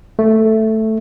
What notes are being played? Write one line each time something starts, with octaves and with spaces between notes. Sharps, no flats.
A3